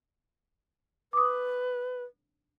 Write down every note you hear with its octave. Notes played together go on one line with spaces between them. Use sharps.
B4 D6 D#6